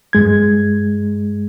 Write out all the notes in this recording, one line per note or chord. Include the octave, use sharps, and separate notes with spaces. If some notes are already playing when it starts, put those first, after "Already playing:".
G2 G#3 G#6